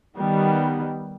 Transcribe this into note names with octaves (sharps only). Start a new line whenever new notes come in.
D#3 G3 B3